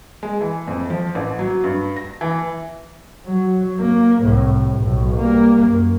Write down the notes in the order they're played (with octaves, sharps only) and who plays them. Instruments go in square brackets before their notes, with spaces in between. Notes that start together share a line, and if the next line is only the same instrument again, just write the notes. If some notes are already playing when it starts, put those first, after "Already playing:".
[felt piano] G#3
E3
F2
F3
A1
F#3
G2
A#6
E3
[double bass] F#3
A#3
C2 A2
B1 A2
G3 A#3
F#2